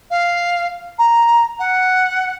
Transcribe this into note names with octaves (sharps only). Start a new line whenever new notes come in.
F5
A#5
F#5